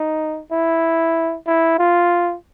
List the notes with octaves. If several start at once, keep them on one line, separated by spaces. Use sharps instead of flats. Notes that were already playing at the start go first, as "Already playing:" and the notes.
Already playing: D#4
E4
E4
F4